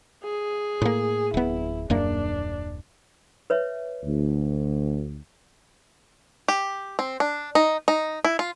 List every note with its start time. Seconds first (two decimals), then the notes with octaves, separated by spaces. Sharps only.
0.24 G#4
0.82 A2 A#3
1.34 D1 B3 E4
1.90 D#1 F#2 A#3 D4
3.50 B4 C#5 E5
4.03 D2
6.48 G4
6.99 C4
7.20 D4
7.55 D#4
7.88 D#4
8.25 E4
8.39 F4